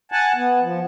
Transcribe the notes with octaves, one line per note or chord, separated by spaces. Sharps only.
F#5 G#5 A5
B3
F3